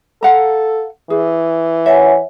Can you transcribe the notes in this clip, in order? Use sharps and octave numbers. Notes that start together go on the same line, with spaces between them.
A4 F5 F#5 A#5
E3 G#4
C#5 E5 F#5 G#5